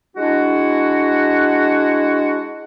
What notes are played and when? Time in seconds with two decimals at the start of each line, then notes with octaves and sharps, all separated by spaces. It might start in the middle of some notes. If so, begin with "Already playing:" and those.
0.16 G#3 D4 E4 F#4